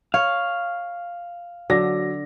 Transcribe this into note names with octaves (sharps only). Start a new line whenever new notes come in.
C#5 F5
D3 F#3 A#6